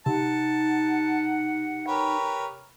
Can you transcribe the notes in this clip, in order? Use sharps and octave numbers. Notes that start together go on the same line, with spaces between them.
C3 D#4 F#5 A5
G4 A#4 B4 C#5